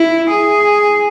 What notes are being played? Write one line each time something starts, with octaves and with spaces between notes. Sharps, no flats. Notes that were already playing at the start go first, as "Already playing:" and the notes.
Already playing: E4
G#4